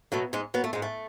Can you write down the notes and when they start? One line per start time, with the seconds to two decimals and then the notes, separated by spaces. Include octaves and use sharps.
0.12 B2 F#3 A3
0.33 G#2 G#3
0.54 F#3 B3
0.64 A3
0.73 G#2 G#3
0.82 A3